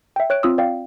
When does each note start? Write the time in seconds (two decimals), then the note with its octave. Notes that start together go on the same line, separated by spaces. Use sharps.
0.16 E5 G5
0.30 C#5 F#6 D7
0.43 C4 F4 D#6 E6
0.58 D5 F5 G5